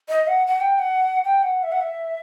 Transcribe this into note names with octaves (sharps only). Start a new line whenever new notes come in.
D#5
F#5
F#5
G5
G5
F#5
G5
F#5
E5
F#5
E5